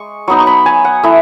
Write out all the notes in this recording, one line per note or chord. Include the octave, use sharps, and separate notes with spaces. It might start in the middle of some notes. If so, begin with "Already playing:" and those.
Already playing: G#3 C#6
F#3 B3 D#4 C#6
C#6
B5
G#5
F#5
A3 E4 E5